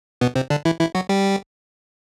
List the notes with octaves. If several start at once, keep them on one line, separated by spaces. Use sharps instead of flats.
B2 B3
C3 C4
D3 D4
E3 E4
E3 E4
F#3 F#4
G3 G4